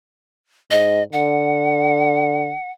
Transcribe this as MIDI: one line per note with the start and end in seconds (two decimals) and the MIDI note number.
0.71 1.01 44
0.71 1.03 75
1.13 2.53 50
1.13 2.71 78